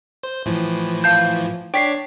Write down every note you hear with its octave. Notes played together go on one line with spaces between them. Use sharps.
C5
A2 E3 F3
F5 A5 G6
D4 C#5 D5 G5 B6 C7